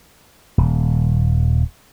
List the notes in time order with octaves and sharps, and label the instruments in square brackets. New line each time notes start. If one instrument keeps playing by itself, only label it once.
[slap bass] D#1